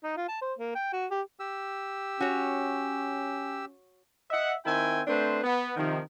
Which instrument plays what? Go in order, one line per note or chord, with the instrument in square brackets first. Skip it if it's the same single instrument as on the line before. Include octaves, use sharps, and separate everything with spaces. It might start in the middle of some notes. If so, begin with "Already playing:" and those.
[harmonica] D#4
F4
A5
C5
A#3
G5
F#4
G4
[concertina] G4 E6
[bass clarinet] C#4 [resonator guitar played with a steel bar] F#4 C#5
[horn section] D#5 E5 F#5
D#3 C4 E4 E5 G5 G#5
A3 C4 D4 B4 C5
B3
C3 D#3 F3